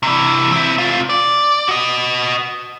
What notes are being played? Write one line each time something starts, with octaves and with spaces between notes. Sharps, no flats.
C3 E3
C4 E4
C3 F4
D5
F#4 D#5